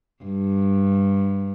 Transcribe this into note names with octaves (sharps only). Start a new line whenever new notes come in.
G2